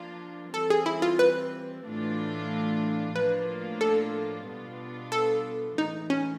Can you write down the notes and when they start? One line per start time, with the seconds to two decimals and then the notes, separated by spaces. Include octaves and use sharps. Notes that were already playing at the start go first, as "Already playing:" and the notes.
Already playing: F3 A#3 D4 F4
0.53 E3 G3 C4 A4
0.70 G#4
0.86 E4
1.02 F4
1.19 B4
1.84 A2 E3 A3 D4 F4
3.16 A2 F3 A#3 D4 F4 B4
3.81 A4
4.46 B2 G3 B3 D4 F4
5.12 A4
5.78 A2 E3 G#3 D#4
6.10 C#4